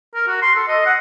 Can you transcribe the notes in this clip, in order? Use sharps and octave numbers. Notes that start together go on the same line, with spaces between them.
A#4
F#4
C6
A4
D#5
F#5